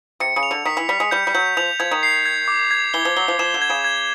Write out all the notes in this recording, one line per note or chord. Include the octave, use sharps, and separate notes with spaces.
C3 C#7
C#3
F7
D3
D#3 B6
E3
G3 B6
G#3
G3 G6
G3
F#3 G6
F3 F7
F3 G#6
D#3
C7
G#6
D6
G#6
E3 G7
F3
F#3 G7
F3
F3 E7
D3
G#6
C#3
G#6